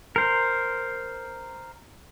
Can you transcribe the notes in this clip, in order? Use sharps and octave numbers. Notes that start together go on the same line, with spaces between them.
A#4 C5